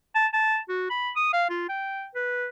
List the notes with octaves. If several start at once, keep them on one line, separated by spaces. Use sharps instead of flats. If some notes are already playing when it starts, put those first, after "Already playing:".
A5
A5
F#4
B5
D#6
F5
F4
G5
B4